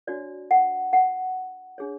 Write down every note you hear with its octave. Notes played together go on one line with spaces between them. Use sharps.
D4 F#4 C#5 D5
F#5
F#5
D4 G#4 C#5